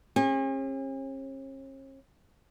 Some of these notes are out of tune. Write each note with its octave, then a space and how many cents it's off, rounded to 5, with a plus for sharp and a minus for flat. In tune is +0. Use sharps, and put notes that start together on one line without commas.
C#4 -45 G#4 -40